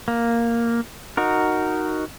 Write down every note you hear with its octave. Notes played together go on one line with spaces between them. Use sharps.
A#3
D#4 F#4 A#4